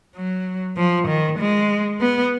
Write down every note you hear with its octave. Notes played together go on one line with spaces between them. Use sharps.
F#3
F3
D#3
G#3
B3